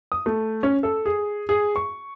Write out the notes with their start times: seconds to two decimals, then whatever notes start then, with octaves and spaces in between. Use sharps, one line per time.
0.12 D#6
0.26 A3
0.63 C#4
0.83 A4
1.06 G#4
1.49 G#4
1.76 C#6